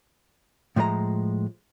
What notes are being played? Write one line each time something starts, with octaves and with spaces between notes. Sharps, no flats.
A2 F3 G#3 B4 A#5